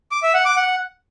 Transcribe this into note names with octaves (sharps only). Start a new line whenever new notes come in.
D6
E5
F#5
D6
F#5